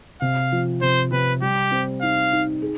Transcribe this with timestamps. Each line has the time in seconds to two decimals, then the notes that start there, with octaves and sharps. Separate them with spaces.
0.21 C3 F5
0.52 F3
0.82 C3 C5
1.11 C3 B4
1.42 G3 G4
1.71 C4
2.02 D#4 F5
2.32 D#4
2.62 G#4